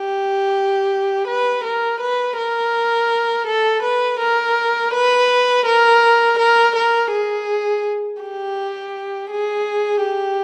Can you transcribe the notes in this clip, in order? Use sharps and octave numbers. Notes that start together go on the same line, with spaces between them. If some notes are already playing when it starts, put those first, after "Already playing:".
Already playing: G4
B4
A#4
B4
A#4
A4
B4
A#4
B4
A#4
A#4
A#4
G#4
G4
G#4
G4